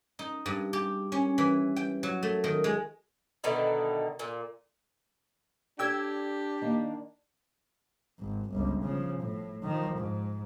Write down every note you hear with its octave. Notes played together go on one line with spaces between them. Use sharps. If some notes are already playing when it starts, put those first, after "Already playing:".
D#4
G2
G4
C#4
E3
G5
F#3
A3
D#3
G#3
B2 D3 D#3 E4
A#2
D4 G4 A4 D5 G5 E6 G#6
D#3 A#3
G#1
G1 C#2
C#3 F3
A2
D#3 F3
G#2